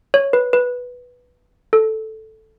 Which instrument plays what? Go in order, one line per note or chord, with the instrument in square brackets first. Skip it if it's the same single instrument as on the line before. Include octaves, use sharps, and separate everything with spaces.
[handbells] C#5
B4
B4
A4